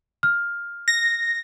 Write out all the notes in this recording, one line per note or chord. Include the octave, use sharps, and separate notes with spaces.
F6
A#6